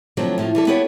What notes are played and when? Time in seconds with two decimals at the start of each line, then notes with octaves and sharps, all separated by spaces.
0.17 D3 F3 F#3 A3 C4
0.38 A2 F3
0.55 E3 G3 A4
0.67 B3 E4 F#4 G4 A4 C#5